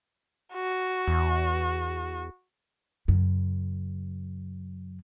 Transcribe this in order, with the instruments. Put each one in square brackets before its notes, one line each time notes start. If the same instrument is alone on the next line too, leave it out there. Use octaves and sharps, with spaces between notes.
[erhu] F#4
[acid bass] E2
[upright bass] F#2 C#3